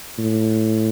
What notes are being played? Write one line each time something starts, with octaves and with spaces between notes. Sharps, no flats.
A2